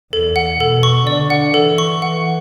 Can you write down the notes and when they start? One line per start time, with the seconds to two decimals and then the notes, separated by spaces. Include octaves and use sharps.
0.13 E2 A4
0.36 F#5
0.60 B2 A4
0.83 C#6
1.07 D3 D5
1.30 F#5
1.54 E3 A4
1.78 C#6
2.02 E3 F#5